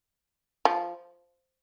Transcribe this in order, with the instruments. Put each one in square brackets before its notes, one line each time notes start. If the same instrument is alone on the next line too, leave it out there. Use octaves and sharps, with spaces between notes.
[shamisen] F3